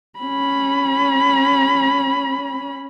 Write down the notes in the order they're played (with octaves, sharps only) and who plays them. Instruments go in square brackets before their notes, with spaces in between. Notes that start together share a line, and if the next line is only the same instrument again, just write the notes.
[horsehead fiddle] C#4 B5